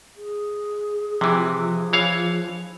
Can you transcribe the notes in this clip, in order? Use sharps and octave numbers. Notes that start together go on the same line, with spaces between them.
G#4
C3 E3 F3
E3 C#5 F5